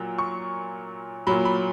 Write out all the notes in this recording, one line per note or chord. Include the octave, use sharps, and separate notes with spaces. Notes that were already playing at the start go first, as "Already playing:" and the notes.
Already playing: A#2 F#3
C#6
A#2 F#3 B5
B5